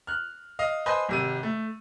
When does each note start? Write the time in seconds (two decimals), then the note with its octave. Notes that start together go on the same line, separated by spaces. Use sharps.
0.07 F6 F#6
0.59 D#5 F5
0.86 B4 C5 D#5 G#5 A5 C6
1.09 G#1 C3 D#7
1.43 A3